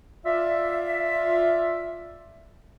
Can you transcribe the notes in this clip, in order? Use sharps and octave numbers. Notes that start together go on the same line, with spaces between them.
F4 D5 E5